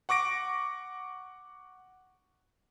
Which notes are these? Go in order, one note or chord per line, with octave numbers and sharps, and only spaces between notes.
F#5 C#6 D6 A#6 D7